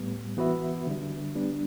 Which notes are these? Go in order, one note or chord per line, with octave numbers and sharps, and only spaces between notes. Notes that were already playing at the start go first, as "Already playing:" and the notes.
Already playing: A2 G3 B3
E3 B3 F#4 B4 E5
D3 G3 D4
G3 B3 D4